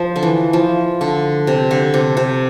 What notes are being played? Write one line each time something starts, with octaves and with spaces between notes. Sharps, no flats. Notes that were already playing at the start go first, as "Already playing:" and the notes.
Already playing: F3
D3
E3
F3
D3
C3
D3
C3
C3